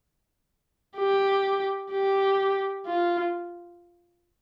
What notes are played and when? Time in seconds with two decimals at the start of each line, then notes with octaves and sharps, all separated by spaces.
0.97 G4
1.91 G4
2.86 F4